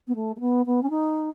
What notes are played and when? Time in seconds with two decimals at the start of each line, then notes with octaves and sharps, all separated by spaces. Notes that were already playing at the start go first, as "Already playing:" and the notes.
0.07 B3
0.15 A3
0.36 A3
0.40 B3
0.66 B3
0.82 C#4
0.90 D#4